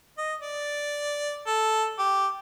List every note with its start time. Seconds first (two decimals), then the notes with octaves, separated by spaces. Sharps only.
0.18 D#5
0.41 D5
1.47 A4
1.98 G4